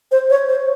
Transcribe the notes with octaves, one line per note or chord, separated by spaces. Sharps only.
C5
C#5
C5